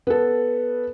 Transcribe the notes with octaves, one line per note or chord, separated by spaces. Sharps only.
B3 A4